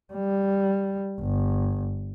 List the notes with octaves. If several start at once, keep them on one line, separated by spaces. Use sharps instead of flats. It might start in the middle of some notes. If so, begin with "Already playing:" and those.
G3
G1